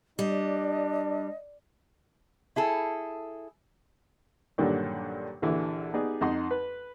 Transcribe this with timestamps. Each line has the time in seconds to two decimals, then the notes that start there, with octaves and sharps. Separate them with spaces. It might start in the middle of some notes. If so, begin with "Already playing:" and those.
0.19 G3 D4 D#5
2.56 E4 G#4 A4
4.58 G2 A#2 D3 D#3 F#3 G3
5.42 A#1 D3 E3 G4 E5
5.94 B3 D#4 G4 G#4 D5
6.21 F2 D#4 F#5 C6
6.51 B4